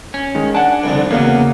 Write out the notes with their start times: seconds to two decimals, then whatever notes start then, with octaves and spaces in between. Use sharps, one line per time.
0.14 C#4
0.35 D#3 G#3
0.55 D4 F#5 G#5 A5
0.84 C2 F2 D3
1.11 E2 C#3 F#3 A#3 B3